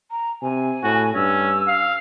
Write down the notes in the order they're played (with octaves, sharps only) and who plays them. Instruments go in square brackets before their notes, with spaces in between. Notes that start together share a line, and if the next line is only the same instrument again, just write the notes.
[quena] A#5
[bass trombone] C3 [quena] G#5
[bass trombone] A2 [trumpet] F#4
[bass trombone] G2 [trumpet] C#4 [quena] E6
[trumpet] F5